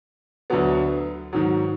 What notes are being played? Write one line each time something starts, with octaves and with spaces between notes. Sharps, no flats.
D2 D3 F#3 B3
G#2 D#3 F#3